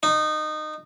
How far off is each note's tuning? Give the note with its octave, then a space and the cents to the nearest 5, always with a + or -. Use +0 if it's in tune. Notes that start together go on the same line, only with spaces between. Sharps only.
D#4 -20